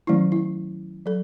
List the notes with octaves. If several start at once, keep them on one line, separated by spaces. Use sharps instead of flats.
D#3 F#3 A3 C#4 E4
E4
F#3 A4